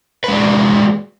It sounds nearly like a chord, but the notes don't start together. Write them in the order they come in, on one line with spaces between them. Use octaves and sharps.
B4 G#3 D5 G#4 F#4